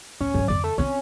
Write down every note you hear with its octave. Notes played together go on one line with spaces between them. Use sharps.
D1 C#4
G#2 F#3
F2 D3 D5
A3
C4 C#4 F4